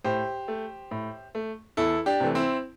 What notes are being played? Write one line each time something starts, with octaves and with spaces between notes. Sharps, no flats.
A2 G4 C5
A3
A2
A3
E2 E4 A4
D4 G4
C3 E3 A3
C4 E4